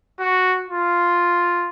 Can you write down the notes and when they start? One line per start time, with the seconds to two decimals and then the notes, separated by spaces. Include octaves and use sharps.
0.19 F#4
0.68 F4